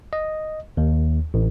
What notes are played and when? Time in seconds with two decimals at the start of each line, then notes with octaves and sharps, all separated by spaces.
0.13 D#5
0.77 D#2
1.34 A1